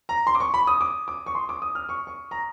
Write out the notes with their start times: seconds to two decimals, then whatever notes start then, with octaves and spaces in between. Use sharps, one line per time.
0.09 A#5
0.27 C6
0.35 D6
0.40 C#6
0.54 B5
0.67 D#6
0.81 D6
1.08 D6
1.26 C#6
1.35 C6
1.49 D6
1.62 D#6
1.75 F6
1.89 C#6
2.07 C#6
2.31 A#5